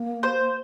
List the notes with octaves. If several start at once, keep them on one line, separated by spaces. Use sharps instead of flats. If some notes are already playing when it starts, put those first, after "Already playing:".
Already playing: A#3
C5